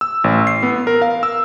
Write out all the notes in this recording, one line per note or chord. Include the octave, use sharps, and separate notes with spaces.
E6
A1
C7
B3
A#4
F5
E6